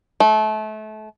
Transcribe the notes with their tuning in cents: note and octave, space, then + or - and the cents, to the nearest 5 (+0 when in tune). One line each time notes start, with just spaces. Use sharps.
A3 -30